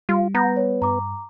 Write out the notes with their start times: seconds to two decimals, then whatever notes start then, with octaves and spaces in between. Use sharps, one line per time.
0.09 G3 F4
0.34 B3 A#5 G6 A#6
0.57 C#5
0.82 G2 A#5 D6